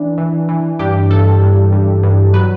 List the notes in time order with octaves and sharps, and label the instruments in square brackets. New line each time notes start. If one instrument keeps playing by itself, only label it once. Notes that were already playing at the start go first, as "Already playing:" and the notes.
Already playing: [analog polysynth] E3 D4
E3
E3
G2 G4
G2 A4
G2
G2
G2
F#3 B4